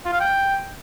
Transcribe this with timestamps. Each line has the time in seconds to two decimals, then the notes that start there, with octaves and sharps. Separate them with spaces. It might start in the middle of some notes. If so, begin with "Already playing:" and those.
0.05 F4
0.13 F5
0.20 G5